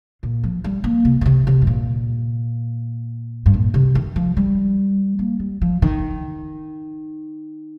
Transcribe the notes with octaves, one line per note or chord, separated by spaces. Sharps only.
A#2
F3
G3
A#3
C3
A#2
C3
C3
G2
A#2
G2
A#2
C3
D#3
F3
G3
A#3
G3
F3
D#3